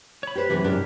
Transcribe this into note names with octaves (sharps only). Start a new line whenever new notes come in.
C#5 B5
G4 B4 C5
F#2 C3 E3 B3
G#2 D4 G4 A#4